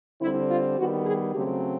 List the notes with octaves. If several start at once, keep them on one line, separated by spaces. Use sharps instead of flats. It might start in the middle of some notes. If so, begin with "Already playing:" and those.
D3 G3 C4 E4
F4
D#3 G3 B3 F#4
G#4
C#3 F#3 A3 C4 G4